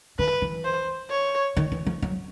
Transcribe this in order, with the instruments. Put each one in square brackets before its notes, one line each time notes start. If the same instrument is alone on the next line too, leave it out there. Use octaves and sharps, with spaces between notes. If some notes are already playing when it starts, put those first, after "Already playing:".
[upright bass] D#3 [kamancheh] B4
[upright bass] E3
[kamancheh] C5
C#5
[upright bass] D#3
E3
F3
F#3